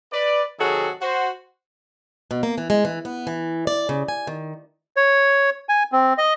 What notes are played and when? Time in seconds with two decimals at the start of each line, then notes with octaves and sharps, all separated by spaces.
0.13 B4 D5
0.59 C3 D#3 F#3 F#4 G#4 A4
1.01 F#4 C5
2.31 B2
2.43 A#3
2.58 E3
2.70 G#3
2.85 E3
3.05 B3
3.27 E3
3.67 D5
3.89 C#3
4.08 G#5
4.27 D#3
4.96 C#5
5.69 G#5
5.92 C4
6.18 D#5